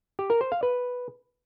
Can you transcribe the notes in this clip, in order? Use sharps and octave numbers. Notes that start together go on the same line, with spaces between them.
G4
A#4
C5
F5
B4